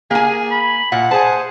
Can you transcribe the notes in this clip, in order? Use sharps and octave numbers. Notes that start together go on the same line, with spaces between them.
A#3 G#4 G#5
B5
A#2 F#5
G#4 C5 A5